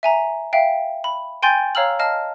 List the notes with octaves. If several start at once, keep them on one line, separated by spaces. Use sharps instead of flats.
E5 G#5 A#5
E5 F5 G5
B5
G5 G#5 C6 G6 A6
C#5 F5 A#5 E6 F6 F#7
D#5 F5 A5 F6